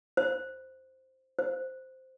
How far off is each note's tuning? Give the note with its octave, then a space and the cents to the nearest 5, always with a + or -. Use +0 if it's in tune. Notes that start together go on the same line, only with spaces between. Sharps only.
C5 +0
C5 -5